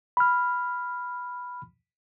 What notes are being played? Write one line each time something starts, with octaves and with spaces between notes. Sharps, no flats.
B5 F6